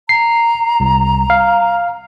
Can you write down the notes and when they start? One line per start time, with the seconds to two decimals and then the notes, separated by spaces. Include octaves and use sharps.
0.09 A#5 C7
0.80 C2
1.30 F5